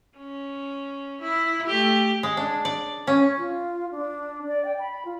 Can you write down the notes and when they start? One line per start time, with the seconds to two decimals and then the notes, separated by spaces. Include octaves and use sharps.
0.17 C#4
1.22 E4
1.68 A3 G4
2.23 G#3
2.37 D4
2.65 D5
3.07 C#4
3.38 F4
3.91 D4
4.48 D5
4.65 G5
4.79 B5
5.05 F4